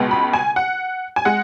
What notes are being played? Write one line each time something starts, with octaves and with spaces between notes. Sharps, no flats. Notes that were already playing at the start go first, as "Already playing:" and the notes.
Already playing: C#2 B2 G#3 B3
B5
G#5
F#5
G#5
G#3 F#5